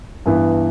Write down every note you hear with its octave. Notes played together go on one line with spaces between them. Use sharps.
G2 E3 B3